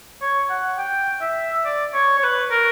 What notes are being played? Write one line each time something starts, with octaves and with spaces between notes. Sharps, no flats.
C#5
F#5
G5
E5
D5
C#5
C#5
B4
A#4